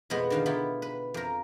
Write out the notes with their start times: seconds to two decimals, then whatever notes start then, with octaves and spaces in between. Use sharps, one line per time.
0.10 F2 B2 G#3 B3 B4
0.30 D3 D#3 F5
0.46 B3 E4 F4 G4
0.82 B4
1.14 F2 A#4